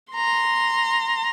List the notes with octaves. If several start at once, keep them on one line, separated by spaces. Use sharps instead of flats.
A#5 C6